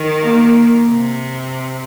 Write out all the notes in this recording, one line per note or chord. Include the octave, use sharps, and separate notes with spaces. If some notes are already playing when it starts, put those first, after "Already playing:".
Already playing: D#3
A#3
C3